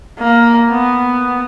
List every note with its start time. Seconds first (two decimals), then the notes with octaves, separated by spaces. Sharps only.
0.19 A#3
0.71 B3